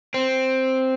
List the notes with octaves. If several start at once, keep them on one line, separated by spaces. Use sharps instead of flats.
C4